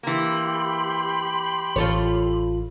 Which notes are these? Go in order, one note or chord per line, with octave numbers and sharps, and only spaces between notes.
E3 A#3 G4 B5 C6
A1 F4 A4 C#5